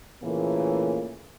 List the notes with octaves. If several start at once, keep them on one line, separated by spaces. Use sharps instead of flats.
A#2 C#3 E3 A3 A#3